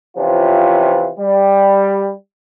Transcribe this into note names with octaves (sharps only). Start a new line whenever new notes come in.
C3 E3 F3 C#4 F4
G3